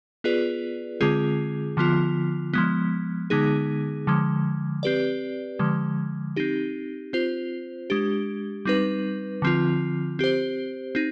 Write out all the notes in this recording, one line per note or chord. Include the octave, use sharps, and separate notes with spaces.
B3 F4 G#4 B4 D5
D3 G#3 C4 F4 G#4
D3 F3 B3 F4
F3 G#3 B3
D3 G#3 B3 D#4 G#4
D3 F3 G#3
C4 G4 B4 D5
D3 F3 G#3
C4 D#4 G4
C4 F4 C5
G#3 D4 G4
G3 C4 D#4 B4
D3 F3 C4 F4
C4 G4 C5
C4 D#4